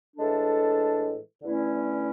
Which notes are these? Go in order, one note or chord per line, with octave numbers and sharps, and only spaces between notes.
A2 E3 G#3 D4 A4
E2 D3 A3 C#4 E4